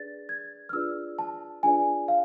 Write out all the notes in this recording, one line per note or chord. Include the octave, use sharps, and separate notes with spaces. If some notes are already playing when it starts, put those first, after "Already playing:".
Already playing: D4 G#4 B4 D5 A6
G#6
F6
D4 F4 G#4 B4 D5 E6
A5
D4 F4 G#4 B4 D5 G#5
F5